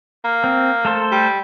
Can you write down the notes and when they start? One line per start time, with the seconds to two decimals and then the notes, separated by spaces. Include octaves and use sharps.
0.25 A#3
0.44 C4
0.85 A3 A4 C5
1.12 G3